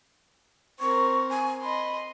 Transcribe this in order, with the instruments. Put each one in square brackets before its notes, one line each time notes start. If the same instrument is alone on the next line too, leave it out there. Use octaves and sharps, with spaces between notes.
[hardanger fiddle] C4 A#4 [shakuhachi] C#6
[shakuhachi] G#5
[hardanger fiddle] D#5 C6 [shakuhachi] B5